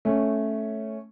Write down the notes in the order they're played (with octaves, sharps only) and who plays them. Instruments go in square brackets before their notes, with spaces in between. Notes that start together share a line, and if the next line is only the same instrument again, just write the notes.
[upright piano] A3 C#4